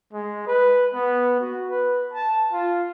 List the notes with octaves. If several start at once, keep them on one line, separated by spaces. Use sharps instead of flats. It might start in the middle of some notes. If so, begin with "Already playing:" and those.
G#3
B4
B3
F#4
B4
A5
F4